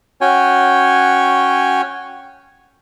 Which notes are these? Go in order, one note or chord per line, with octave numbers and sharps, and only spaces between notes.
C#4 F#4 C#5 G5 G#5